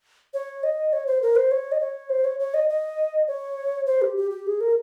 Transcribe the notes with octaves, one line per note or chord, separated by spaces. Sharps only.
C#5
D#5
C#5
C5
A#4
C5
C#5
D#5
C#5
C5
C#5
C#5
D#5
D#5
C#5
C5
G4
G4
G4
G#4
A#4